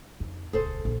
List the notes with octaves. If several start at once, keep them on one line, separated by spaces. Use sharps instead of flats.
F2 D#4
D#1 C#2 G#4 A4 C5
A#1 F#2